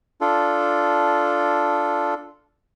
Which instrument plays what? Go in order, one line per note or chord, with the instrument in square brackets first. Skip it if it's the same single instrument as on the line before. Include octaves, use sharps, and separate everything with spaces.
[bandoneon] D4 F4 A4